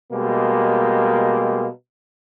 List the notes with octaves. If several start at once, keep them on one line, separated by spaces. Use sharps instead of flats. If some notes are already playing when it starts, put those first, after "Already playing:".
B2 G3 G#3 A#3